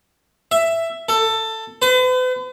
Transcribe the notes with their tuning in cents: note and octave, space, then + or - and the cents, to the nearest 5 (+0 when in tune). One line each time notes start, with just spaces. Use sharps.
E5 +10
A4 +15
B4 +45